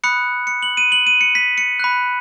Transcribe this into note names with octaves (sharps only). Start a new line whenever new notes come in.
B5 D#6 F#6 C#7
C#7
F#7
D#7
F#7
D#7
C#7
B6
C#7
B5 F#6